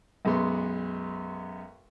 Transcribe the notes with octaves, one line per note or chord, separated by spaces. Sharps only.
B1 F#2 G#3 B3 C6